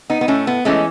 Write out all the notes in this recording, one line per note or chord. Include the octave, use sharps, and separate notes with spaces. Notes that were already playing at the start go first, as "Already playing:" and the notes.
B3 D#4
B3
A2 A3 C#4
B3
E3 G#3 A3 C#4